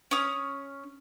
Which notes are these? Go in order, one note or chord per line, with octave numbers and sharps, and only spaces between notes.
C#4 D#6